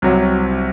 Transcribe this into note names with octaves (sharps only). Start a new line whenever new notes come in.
C2 C3 F#3